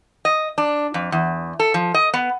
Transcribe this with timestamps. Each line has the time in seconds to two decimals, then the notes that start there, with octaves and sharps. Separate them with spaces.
0.25 D#5
0.58 D4
0.94 F2
1.12 E2
1.59 A4
1.74 F3
1.94 D#5
2.14 B3